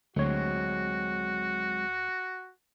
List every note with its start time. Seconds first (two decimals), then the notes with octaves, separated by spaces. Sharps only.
0.16 D2 F#3 G#3 C4 F#4 C#5